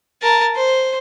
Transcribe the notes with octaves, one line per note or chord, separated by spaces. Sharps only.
A#4 A5
C5